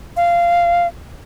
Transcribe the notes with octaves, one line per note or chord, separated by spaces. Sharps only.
F5